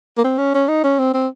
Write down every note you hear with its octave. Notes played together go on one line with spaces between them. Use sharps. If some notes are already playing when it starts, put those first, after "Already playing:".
A#3
C4
C#4
C#4
D#4
C#4
C4
C4